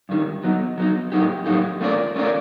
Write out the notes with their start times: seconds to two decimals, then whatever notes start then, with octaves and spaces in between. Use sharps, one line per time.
0.09 G2 D#3 G3
0.43 F#3 B3 D#4
0.78 F#3 B3 D#4
1.12 A2 F#3 A#3 D#4 G4
1.46 A2 F#3 A#3 D#4 G4
1.81 A3 C#4 F4 A#4 D5
2.16 A3 C#4 F4 A#4 D5